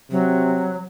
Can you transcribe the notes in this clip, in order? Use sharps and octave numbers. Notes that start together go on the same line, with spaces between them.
C3 F#3